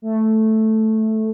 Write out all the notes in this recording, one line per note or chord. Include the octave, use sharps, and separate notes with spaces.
A3